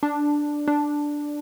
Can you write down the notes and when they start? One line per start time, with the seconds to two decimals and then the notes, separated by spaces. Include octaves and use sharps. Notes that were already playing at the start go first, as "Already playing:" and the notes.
0.03 D4
0.68 D4